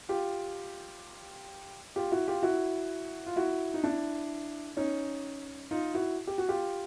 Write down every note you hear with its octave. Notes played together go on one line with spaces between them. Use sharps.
F4 G4
F4 G4
E4 F#4
F4 G4
E4 F#4
F4
E4 F#4
D#4
D4 E4
C#4 D#4
D#4 F4
E4 F#4
G4
F#4
F4 G4